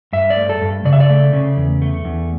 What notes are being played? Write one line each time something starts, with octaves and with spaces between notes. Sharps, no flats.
G2 E5
D5
A3
A4
G2
C#3 D5
E5
D5
A3
C#3
E2
A3
E2